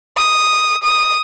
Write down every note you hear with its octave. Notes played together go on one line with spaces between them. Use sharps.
D#6
D#6